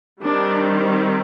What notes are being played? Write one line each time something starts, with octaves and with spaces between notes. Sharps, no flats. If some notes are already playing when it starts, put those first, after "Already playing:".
D#3 G3 C4 D4